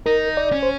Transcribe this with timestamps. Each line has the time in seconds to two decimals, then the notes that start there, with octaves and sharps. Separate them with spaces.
0.06 D#4 A#4
0.37 D5
0.52 C#4
0.63 C5